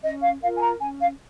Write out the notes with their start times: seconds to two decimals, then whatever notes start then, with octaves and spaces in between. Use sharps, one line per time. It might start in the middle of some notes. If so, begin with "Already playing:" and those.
0.01 C#4 D#5
0.21 F5
0.41 F4 A#4 F5
0.55 G#5
0.60 A#5
0.79 C#4 G#5
0.99 F5